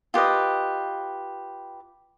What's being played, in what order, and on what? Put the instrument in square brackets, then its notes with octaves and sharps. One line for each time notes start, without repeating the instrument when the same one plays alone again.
[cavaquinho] F4 G4 B4 D#5